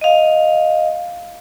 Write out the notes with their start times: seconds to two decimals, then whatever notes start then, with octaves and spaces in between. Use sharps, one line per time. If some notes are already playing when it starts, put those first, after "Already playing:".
0.01 D#5 F5